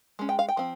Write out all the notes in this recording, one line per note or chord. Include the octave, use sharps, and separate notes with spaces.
G#3 C#4
G5
F5
G5
F3 C4